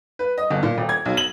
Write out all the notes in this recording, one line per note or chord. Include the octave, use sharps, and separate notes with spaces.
B4
D#5
G1
A#2
D#1
G#6
B1
F#7